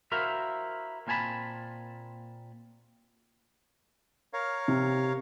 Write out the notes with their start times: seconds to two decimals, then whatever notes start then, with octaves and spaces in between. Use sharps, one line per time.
0.12 E4 F#4 A#4 C5 E5 F5
1.07 A#2 A#3 C4 G#5 A5 B5
4.33 A#4 C#5 F5
4.68 C3